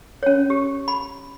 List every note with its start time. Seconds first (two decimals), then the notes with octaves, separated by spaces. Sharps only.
0.23 C#4 C#5
0.50 G4
0.88 B5